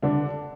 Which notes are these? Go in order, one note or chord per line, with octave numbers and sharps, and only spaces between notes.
D3 D4